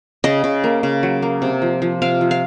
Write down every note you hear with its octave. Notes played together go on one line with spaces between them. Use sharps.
C#3 D#5
C#3
A#3
C#3
F#3
A#3
C3
F3
F3
C3 F5
F3
F5